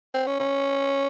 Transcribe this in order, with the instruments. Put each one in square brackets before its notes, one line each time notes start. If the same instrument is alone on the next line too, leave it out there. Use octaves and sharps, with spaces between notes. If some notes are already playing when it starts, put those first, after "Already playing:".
[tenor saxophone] C4
C#4
C#4